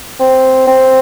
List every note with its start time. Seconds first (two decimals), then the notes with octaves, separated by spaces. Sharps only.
0.20 C4
0.67 C4